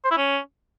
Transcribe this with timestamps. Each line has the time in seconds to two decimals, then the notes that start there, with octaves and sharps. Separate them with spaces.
0.04 C5
0.11 E4
0.17 C#4